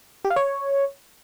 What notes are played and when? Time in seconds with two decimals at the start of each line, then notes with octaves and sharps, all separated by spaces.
0.25 G4
0.30 F5
0.36 C#5